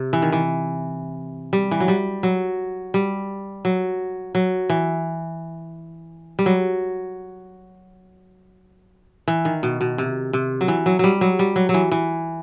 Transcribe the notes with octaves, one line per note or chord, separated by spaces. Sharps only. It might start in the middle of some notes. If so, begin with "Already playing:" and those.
Already playing: C3
E3
D#3
E3
G3
E3
F#3
G3
F#3
G3
F#3
F#3
E3
G3
F#3
E3
D#3
B2
B2
C3
C3
F#3
E3
F#3
F#3 G3
F#3
G3
F#3
F#3
E3
E3